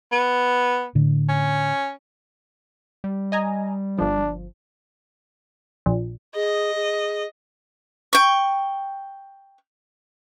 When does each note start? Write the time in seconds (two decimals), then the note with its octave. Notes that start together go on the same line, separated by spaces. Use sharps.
0.12 B3
0.95 A2 D3
1.29 C#4
3.04 G3
3.32 D#5 G#5 A#5
3.99 G1 F3 D4
5.86 A#1
6.35 G#4 D#5
6.76 G#4
8.13 G5 C#6